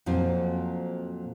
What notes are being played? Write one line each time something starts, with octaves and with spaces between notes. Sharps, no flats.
F2 A#2 F#3 C4